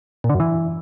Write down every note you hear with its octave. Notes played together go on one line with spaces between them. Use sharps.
A#2
D3
F#2
E3